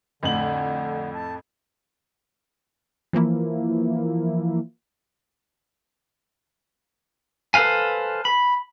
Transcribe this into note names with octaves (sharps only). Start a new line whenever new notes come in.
F2 A2 D3 F#7
A5
E3 F3 A#3 E4
A4 B4 C5 F5 G#5
B5